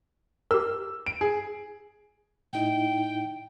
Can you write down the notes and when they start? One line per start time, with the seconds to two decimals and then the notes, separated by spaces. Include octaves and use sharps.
0.51 G4 A#4 E6
1.06 D7
1.21 G#4
2.53 A2 D#4 E4 G5